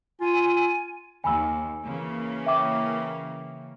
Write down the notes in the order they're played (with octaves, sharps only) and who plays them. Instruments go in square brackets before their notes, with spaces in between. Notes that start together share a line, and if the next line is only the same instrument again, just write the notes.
[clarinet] F4 [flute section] G#5
[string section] D#2 [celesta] G#5 B5 E6
[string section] C#3 E3 A#3
[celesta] E5 G5 D6